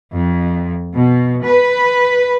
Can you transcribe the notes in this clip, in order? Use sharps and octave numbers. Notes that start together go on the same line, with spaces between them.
F2
B2
B4